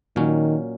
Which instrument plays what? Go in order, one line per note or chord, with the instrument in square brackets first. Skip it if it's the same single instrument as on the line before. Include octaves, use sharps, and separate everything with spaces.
[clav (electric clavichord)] A#2 F#3 C#4 [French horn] D#3